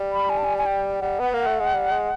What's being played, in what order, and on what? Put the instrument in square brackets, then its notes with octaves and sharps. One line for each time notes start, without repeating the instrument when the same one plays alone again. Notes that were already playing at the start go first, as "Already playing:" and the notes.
Already playing: [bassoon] G3
[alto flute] B5
G#5
A5
G#5
G#5
G5
[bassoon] G3 [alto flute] F#5
[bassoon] B3
A#3
A3
G#3
G3
G#3